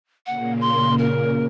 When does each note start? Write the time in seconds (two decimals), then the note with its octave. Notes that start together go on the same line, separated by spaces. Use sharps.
0.26 A#2 C#3 A#3 F#5
0.61 C6
0.98 A#4